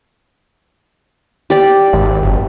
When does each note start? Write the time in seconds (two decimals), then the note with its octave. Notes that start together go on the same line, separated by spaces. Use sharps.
1.50 G4 D5
1.93 G#1
2.22 F#1